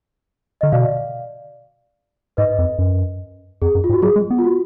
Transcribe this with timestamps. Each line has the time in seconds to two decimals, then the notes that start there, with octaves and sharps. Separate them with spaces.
0.61 D3 D#5
0.72 B2 D5 F5
2.37 G#2 B4 D#5
2.58 F2
2.79 F#2
3.62 F2 G#4
3.75 F#2
3.84 F4
3.89 G#2
3.93 F#4
4.02 F#3 G#4
4.16 G#3
4.30 B3
4.39 F4
4.44 F#4